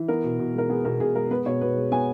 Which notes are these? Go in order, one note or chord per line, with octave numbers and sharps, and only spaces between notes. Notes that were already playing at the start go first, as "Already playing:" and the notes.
Already playing: E3
B3 A#4
B2
B2
G#3 A#4
B3 G#4
B2 A#4
B2 G#4
G#3 A#4
B3 B4
B2 C#5
B2 B4
G#3
B3 G#5